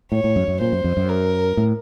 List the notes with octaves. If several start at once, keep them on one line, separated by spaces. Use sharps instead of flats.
A2 C#5
A2
F#2
F#2
A#2 C5
F#2
F2
F#2
A#4
A2